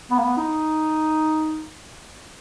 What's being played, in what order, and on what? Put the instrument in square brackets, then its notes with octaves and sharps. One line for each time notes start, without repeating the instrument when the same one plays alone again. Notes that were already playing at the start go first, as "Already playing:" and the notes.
[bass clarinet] B3
A#3
B3
D#4